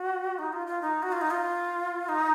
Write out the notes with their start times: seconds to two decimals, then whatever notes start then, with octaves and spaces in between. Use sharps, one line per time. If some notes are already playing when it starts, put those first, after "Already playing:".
Already playing: F#4
0.39 D#4
0.53 F4
0.67 F4
0.81 D#4
1.02 F#4
1.12 F4
1.21 D#4
1.30 F4
2.08 D#4